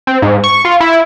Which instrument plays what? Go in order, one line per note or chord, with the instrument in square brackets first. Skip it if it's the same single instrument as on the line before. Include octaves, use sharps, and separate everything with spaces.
[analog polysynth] C4
G#2
C#6
F4
E4